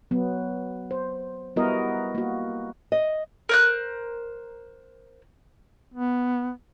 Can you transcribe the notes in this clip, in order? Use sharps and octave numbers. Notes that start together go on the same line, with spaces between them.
F#3 B3
C5
G3 B3 E4 F#4 A#4 D#5
A#3 F#4
D#5
A#4 C5 F#6
B3